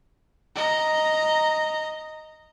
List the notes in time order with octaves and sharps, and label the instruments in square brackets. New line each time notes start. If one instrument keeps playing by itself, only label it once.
[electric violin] D#5 A#5